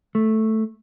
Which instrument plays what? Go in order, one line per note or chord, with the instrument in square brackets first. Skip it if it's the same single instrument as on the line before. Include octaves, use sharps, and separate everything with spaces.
[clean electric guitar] A3